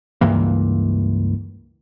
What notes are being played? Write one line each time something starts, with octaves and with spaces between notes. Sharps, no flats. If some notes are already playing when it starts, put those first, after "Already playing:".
C#2 G2 E3 A#3